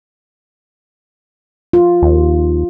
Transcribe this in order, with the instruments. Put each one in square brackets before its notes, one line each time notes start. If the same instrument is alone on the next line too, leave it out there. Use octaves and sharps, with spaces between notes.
[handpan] F4
[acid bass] D#2